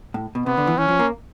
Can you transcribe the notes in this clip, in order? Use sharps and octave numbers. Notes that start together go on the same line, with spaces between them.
A2
B2
C3 B3
D3
E3
E3 C#4
F3
A#3